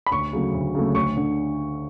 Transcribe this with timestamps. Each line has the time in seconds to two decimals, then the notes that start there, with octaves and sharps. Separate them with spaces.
0.06 B5
0.11 D2 C#6
0.33 C#3 F#3 A3
0.54 D2
0.75 C#3 F#3 A3
0.95 D2 C#6
1.17 D3